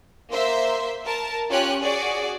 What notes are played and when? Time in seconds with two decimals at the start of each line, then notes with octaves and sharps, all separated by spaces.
0.31 A#3 C5 E5 C6
1.05 A#4 A5
1.50 C#4 F4 G4 C#5 G#5 F#6
1.82 F#4 G#4 D5 G#5